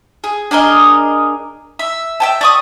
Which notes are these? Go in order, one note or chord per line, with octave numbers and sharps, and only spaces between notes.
G#4
D4 G#4 A#4 D#5
E5
E5 G5 A5
D5 C#6 D#6